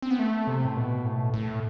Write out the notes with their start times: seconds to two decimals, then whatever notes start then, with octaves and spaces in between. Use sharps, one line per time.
0.02 C4
0.11 B3
0.19 A3
0.47 C3
0.65 A2
0.77 B2
1.05 A2
1.34 A2